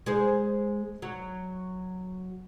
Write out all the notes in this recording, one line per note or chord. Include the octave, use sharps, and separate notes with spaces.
G#3 G#4 C5
F#3